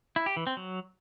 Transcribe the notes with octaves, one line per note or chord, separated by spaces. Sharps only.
E4
G4
E3
C4
F#3